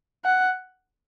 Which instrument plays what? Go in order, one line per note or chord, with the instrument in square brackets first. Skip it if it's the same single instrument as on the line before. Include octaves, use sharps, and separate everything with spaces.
[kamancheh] F#5